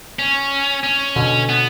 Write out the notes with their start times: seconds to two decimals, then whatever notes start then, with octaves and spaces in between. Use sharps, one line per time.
0.19 C#4
0.84 C#4
1.16 B2 D3
1.49 B3